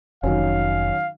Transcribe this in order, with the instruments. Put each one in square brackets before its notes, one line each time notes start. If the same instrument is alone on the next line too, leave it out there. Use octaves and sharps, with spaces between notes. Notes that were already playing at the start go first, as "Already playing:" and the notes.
[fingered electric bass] F1 [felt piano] D#3 F#3 C#4 [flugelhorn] F5